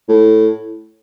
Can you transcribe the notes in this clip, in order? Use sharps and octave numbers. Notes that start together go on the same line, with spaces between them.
A2